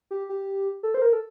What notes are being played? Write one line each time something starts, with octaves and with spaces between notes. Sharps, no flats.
G4
G4
A4
C5
A#4
A4